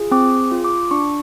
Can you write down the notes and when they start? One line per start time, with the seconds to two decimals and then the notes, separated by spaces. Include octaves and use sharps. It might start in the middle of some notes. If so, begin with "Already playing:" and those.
Already playing: F4 G#4
0.11 C4 D6
0.52 F4
0.65 D6
0.91 D4 C#6